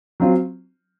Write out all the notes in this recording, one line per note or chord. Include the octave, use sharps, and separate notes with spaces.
F#3 C4 F4